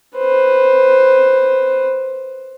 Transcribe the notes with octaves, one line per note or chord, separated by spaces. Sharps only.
B4 C5